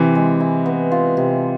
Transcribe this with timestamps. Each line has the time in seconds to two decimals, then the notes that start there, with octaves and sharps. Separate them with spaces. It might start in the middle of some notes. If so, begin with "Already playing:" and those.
Already playing: C3 E3
0.15 G#3
0.40 E4
0.66 B3
0.92 F4
1.17 C3